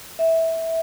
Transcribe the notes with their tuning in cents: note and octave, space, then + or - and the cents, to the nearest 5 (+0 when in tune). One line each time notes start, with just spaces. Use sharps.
E5 -15